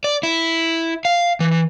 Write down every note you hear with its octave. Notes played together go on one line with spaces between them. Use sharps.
D5
E4
F5
E3